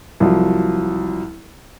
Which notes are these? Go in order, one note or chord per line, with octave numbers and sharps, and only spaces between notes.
C2 F3 F#3